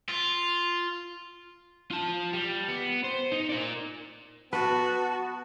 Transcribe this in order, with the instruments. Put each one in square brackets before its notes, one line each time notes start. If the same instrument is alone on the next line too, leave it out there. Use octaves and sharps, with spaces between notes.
[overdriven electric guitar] F4
F4 A5
G3
B3
C5
D#4
A#4 D5
[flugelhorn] B3 [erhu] F#4 [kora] B4 [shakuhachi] A5